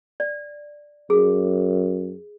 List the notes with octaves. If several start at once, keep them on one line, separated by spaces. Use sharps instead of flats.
D5
F#2 G#4